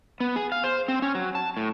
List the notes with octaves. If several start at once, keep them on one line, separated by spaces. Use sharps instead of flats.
B3
G#4
F5
C5
C4
C#4
F#3
A5
A2